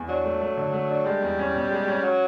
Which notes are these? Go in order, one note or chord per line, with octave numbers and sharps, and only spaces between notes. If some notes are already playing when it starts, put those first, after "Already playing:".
Already playing: E2
F#3 D4
A3
A3
D3
A3
D4
G3 G#3
E2
C#4
B2
G#3
C#4
F#3